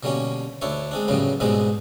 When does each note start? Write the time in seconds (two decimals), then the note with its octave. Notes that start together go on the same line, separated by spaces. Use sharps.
0.03 B2 D3 G3 A#3 C#4
0.62 D2 D4 E4 C#5
0.91 G#3 C4 D4
1.08 F#2 A2 C#3 G3 B3
1.40 G#2 B2 G3 G#3 B3 C4